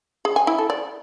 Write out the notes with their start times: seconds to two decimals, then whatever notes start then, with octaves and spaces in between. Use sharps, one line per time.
0.25 G#4
0.36 G#5
0.47 E4
0.58 A4
0.70 D5